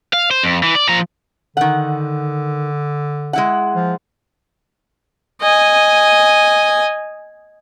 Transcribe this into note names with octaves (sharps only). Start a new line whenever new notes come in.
F5
C5
F2
E3
D5
F3 A#5
D3 D#3 F#5
G#3 E4 F#5
F3
D#5 G#5